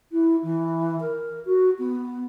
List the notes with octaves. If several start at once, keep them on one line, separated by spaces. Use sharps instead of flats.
E4
E3
A#4
F#4
B3